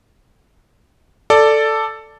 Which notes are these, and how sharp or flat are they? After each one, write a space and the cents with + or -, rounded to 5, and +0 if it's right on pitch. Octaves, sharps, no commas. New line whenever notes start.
A4 +5 D5 +0